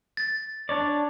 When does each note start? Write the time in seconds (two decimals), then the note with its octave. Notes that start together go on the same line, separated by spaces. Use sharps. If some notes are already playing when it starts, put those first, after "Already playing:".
0.17 A6
0.69 D4 C#5 D5